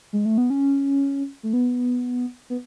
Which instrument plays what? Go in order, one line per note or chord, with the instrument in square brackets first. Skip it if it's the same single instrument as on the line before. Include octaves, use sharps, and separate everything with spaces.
[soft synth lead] G#3
A3
B3
C#4
A3
B3
B3